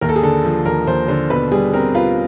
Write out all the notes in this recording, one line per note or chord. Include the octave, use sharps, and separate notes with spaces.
D#2 A#4
A4
G#4
D3 A4
F3
D#2 A#4
D#2 C5
D3 C5
B2 B4
G3 G#4
C4 A#4
F4 B4